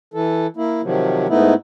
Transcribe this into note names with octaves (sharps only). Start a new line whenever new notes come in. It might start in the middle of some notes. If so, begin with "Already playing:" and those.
E3 A4
A#3 E4
C3 D#3 F3 F#3
G#2 A3 B3 D#4 E4